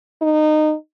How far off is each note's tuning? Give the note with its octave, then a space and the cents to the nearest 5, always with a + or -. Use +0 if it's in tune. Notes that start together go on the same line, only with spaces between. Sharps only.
D#4 -20